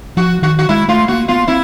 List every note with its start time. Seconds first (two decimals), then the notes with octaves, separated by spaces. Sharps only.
0.17 F3 F#4
0.42 D#3 F#4
0.59 F#4
0.69 G#3 E4
0.88 A3 F4
1.08 A#3 F#4
1.28 B3 F4
1.48 C4 E4